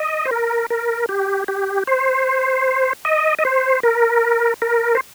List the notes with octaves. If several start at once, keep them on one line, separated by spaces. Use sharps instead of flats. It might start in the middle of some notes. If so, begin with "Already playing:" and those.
Already playing: D#5
C5
A#4
A#4
G4
G4
C5
D#5
D#5
C5
A#4
A#4
C5